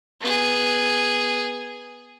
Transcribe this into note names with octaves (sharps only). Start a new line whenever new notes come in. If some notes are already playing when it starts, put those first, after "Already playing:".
B3 G#4